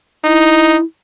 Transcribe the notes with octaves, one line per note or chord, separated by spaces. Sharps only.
D#4 E4